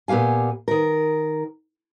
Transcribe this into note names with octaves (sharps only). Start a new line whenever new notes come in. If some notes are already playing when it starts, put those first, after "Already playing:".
A#2 B3 G4 F5 G#5
D#3 A#4